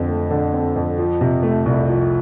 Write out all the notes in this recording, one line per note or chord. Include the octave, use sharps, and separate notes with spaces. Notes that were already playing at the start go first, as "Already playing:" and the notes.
Already playing: F2 D3 C4
A3
D3
C4
F2
F3
C3
A3
C2
F3